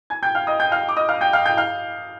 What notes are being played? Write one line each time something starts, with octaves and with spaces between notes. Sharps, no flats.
G#5 G#6
G5 G6
F5 F6
D#5 D#6
G5 G6
F5 F6
D6
D#5 D#6
F5 F6
G5 G6
F5 F6
G5 G6
F5 F6